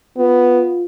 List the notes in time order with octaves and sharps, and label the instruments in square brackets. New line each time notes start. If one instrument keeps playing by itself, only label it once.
[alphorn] B3 [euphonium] F4